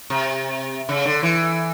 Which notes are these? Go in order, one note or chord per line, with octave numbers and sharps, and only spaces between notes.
C3
C#3
D3
E3